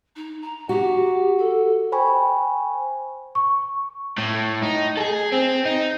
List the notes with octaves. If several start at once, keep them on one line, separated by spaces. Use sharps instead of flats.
D#4
A#5
F#4 G4
A4
C5 G5 G#5 B5 C#6
C#6
A2
D#4
G#4 A4
C4
D#4